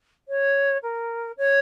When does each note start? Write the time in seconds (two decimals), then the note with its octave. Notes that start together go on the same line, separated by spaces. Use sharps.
0.28 C#5
0.82 A#4
1.37 C#5